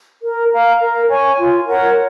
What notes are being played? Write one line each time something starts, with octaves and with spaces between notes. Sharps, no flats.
A#4
F5 A#5
A#4
C#5 G#5 C#6
F4
A#4 C#5 F#5